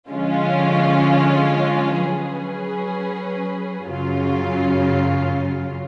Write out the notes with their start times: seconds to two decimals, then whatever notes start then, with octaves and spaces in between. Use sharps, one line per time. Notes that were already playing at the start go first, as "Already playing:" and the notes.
0.10 D3 F3 G#3 C#4 F4
1.99 F#3 C#4 G#4 B4
3.88 F#2 C#3 F#3 C#4 F4